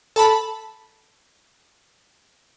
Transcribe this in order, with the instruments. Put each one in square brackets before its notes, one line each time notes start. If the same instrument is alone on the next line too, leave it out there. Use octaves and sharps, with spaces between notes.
[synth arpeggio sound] A4 A5 B5